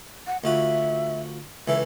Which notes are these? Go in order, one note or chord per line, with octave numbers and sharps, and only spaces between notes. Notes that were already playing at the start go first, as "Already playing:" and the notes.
F#5
D2 F4 F#4 E5
C#2 E3 A4 E5